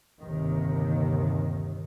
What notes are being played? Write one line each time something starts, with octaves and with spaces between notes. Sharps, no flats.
G1 D#2 C3 D#3